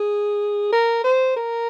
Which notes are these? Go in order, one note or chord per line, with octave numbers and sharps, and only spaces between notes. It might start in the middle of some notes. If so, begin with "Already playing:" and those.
Already playing: G#4
A#4
C5
A#4